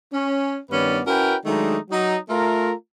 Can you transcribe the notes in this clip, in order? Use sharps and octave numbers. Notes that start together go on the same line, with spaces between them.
C#4
G2 D#3 B3 C#4 B4 D5
C#4 E4 F#4 A#4 B4 G5
D#3 F#3 G#3 A3 D4 D#4
F#3 D#4
A3 F4 A#4